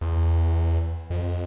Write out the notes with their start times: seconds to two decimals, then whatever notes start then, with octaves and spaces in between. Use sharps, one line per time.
0.01 E2
1.10 F2